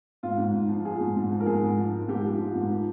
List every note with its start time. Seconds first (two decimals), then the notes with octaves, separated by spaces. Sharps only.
0.23 G#2 F4
0.38 G#2
0.54 G#2
0.69 F3
0.85 F3 G#4
1.00 G#2
1.16 G#2
1.31 F3
1.40 A#4
1.46 G#2 G#4
1.62 G#2
1.78 F3
1.93 F3
2.08 G#2 G4
2.24 F3
2.39 F3
2.55 G#2
2.70 F3